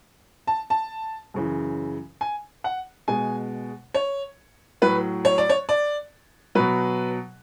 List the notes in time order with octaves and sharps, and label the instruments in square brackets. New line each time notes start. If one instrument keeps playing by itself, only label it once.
[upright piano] A5
A5
F#2 C#3 E3
G#5
F#5
B2 G#3 G#5
C#5
A2 F#3 B4
C#5
D5
C#5
D5
B2 F#3 B4